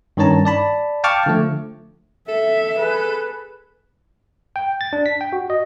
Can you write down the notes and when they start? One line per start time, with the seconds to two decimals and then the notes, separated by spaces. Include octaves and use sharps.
0.17 G2 D#3 C#4 C#5 A5 A#5
0.45 D5 A5 B5
1.04 F5 G5 A5 C#6 D6 F6
1.26 D3 F3 A3
2.28 A4 E5
2.76 G#4 B4
4.56 G5
4.81 A6
4.93 D4
5.06 B6
5.21 G5
5.33 F#4
5.50 D#5